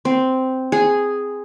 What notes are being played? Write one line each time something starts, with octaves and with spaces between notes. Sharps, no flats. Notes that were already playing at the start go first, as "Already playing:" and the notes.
C4
G#4